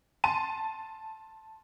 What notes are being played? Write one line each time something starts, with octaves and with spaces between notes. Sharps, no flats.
A5 C6 D#7